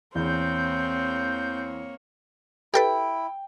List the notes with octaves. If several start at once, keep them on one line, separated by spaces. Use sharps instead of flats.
E2 A#3 C4 C#5 G6
E4 G4 A4 B4 G5